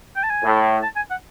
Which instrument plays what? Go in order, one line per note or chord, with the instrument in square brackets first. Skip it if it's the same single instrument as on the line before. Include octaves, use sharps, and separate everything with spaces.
[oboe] G5
A5
G#5
[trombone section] A2
[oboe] A5
G#5
F#5